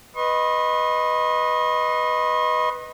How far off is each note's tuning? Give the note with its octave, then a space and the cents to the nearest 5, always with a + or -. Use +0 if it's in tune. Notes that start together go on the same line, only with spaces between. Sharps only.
B4 +0 D#5 +0 C6 +45